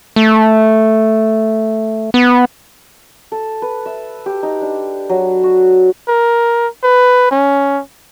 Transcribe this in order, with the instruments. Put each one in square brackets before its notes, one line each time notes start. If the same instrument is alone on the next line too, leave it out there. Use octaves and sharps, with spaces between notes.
[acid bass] A3
B3
[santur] A4
B4
E5
G4
D#4
D4
F#3
F#4
[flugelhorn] A#4
B4
C#4